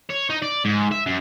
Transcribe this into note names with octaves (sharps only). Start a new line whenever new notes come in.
C#5
D#4
D5
G#2
E5
F#2